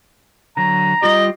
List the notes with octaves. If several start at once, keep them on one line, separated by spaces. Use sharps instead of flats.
D3 F#3 A#5
G3 F4 G4 D#5